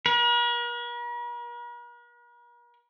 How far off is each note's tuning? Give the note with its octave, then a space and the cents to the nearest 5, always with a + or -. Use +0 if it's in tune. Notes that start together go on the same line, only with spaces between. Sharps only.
A#4 +45